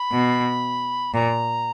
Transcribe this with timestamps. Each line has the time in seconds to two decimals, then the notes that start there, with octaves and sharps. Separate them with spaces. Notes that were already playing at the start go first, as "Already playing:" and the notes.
Already playing: B5
0.12 B2
1.14 A#2 A#5